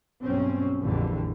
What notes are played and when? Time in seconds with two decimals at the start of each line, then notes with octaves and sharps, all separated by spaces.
0.22 B1 G2 C4 C#4
0.80 A#1 F2 D3 E3 G3